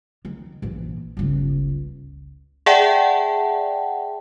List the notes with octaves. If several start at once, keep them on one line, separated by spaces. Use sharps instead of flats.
D#3
A#1 E3
G1 C#2
G#4 D5 E5 F#5 G5 A5